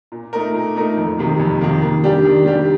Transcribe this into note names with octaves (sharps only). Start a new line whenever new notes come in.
A#2
A3 D#4 A#4
A#2
A3 D#4 A#4
F2
C3 D#3 A#3
F2
C3 D#3 A#3
D#3
G3 D4 G4
D#3
G3 D4 G4